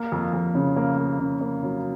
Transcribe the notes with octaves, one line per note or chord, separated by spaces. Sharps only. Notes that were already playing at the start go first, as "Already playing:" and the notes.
Already playing: A#3
F2
F2
C#3
A#3
A#3
C#3
A#3
F#3